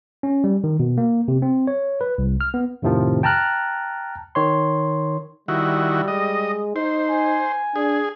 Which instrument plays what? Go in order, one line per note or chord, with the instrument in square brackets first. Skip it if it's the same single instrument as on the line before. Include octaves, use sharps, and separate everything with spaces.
[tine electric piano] C#4
G3
D#3
B2
A#3
C3
C4
C#5
B4
C2
F6
B3
F2 A2 C3 D#3 F3
G5 A5 A#5 F6 F#6
D#3 C#5 C6
[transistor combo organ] D#3 E4 F#4 [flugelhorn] G3
[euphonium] G#3 [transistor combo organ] D#5
[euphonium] D#4 [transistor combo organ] C5
[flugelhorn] G#5
[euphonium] D4 [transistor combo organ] G#4